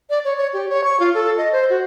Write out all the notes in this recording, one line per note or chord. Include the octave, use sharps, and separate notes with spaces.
D5
C#5
C#5
G4
C#5
C#6
F4
A4
D#5
C5
F#4